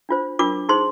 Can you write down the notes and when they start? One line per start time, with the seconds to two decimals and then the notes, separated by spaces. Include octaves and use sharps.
0.09 D4 F4 C5
0.39 D4 F4 A#4 D6
0.69 D#4 G#4 C5 C6